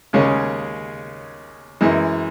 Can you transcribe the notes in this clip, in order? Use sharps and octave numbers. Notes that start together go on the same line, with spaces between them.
D#2 C#3 G#3 C#4
F#2 E3 G#3